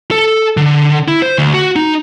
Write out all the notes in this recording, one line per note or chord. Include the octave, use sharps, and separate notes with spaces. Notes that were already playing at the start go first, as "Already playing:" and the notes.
A4
D3
E4
C5
D2
F#4
D#4